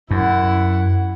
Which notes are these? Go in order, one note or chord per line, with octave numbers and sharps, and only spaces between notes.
F#2 E4 F#5